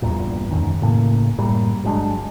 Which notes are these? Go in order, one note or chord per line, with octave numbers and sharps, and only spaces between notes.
A#1 E2 G2 A#2
E1 F#2 D#3
A2 C#3 A#3
F#1 A2 G3 A#3
G1 F#3 G#3 D4